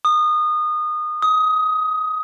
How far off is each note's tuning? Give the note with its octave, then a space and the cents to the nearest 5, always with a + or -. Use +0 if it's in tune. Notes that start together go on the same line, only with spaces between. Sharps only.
D#6 -25
D#6 +20